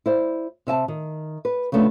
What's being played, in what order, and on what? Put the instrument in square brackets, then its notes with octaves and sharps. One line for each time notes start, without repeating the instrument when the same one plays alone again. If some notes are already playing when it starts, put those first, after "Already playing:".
[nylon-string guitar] E4 C5 D5
C3 E5 G#5 A5
D#3
B4
C#3 F3 A3 B3 D4